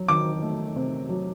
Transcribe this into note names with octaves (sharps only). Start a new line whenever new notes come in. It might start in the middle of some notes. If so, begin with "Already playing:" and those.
Already playing: F#3
D#3 D6
A3
C3
F#3